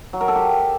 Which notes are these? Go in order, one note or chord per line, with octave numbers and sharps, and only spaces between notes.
F#3
A#4
A4
G4